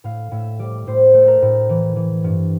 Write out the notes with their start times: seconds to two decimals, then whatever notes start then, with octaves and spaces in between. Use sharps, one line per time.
0.04 A2 F5
0.31 A2 E5
0.59 G3 D5
0.87 A2 C5
1.14 A3
1.22 A4
1.28 A#4
1.42 A2
1.69 E3
1.96 E3
2.24 G2